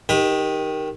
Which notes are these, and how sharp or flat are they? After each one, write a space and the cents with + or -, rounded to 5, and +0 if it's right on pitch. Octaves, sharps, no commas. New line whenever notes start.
D#3 +0 G4 +10 B4 -45